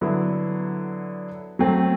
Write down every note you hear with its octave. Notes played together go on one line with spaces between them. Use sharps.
D3 F#3 B3 E4
F#3 A3 C4